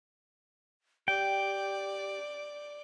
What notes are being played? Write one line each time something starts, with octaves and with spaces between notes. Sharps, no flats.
G4 D5 G5